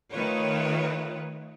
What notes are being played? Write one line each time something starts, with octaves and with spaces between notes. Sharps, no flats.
D#3 A3 F4 B4 C#5